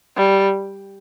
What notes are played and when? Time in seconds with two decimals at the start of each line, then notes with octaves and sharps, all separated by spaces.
0.17 G3